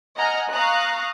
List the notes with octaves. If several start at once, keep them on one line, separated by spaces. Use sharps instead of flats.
D#5 F#5 G#5 A#5 F6
F5 A#5 C#6 D#6 F#6